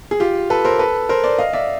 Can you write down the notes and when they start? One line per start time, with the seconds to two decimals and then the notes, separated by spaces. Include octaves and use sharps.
0.11 G#4
0.20 F4 G4
0.50 A4 B4
0.65 A#4 C5
0.79 A4 B4
1.09 A#4 C5
1.24 C5 D5
1.39 D#5 F5
1.53 D5 E5